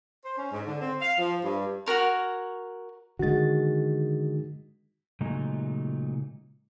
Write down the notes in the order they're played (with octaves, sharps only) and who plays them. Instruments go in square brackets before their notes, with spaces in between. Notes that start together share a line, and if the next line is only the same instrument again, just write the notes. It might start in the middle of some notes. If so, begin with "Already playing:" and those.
[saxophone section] C5
C#4
G#2
D3
C4
F5
F3
G2
[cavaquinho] F#4 G4 A#4 C#5
[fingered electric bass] D3 D#3 G#3 [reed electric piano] F#4 A6
[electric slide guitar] A#2 C#3 F#3 G#3 A3 D#4